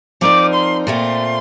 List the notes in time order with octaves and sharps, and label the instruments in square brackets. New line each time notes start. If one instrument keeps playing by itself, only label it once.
[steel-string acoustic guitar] F3 C4 D#4 A#4 D5 [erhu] D6
[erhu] C6
[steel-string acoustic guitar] A#2 A3 C4 F4 [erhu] C6